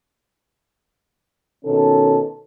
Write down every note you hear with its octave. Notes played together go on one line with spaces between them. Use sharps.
B2 D#3 C#4 A4